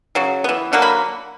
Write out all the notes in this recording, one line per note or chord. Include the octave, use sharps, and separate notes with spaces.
C#3 F#3
E3 B3
D3 F#3 A#3 F#5
B5